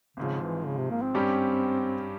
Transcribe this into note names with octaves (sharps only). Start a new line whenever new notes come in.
G#1 G#2 C#3 F3
E3
C#3
C3
A#3
C4
G2 G3 C#4 G4